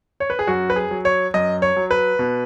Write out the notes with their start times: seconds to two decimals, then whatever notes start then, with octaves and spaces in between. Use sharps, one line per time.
0.20 C#5
0.30 B4
0.39 G#4
0.47 F#2 F#4
0.70 B4
0.76 G#4
0.91 F#3
1.05 C#5
1.34 F#2 D#5
1.62 C#5
1.77 F#3
1.91 B4
2.19 B2